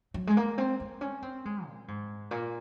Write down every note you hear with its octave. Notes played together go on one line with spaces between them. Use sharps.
F#3
G#3
A#3
C4
C4
C#4
C4
G#3
A#2
G#2
A#2